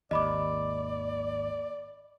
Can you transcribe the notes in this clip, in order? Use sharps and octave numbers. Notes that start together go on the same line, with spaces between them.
G#1 D#2 D5 D#5 B5 D6